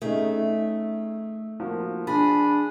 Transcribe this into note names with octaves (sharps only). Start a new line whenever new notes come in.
A3 C#4 D#4 G#4
F3 A#3 F#4
D4 G#4 B5 A6